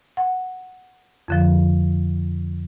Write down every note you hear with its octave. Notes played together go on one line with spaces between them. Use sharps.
F#5
F2 D3 F3